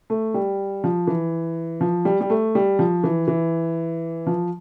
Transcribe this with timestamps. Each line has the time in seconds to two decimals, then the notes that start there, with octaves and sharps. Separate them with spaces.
0.10 A3
0.34 G3
0.84 F3
1.07 E3
1.81 F3
2.05 G3
2.21 G3
2.30 A3
2.55 G3
2.79 F3
3.04 E3
3.28 E3
4.27 F3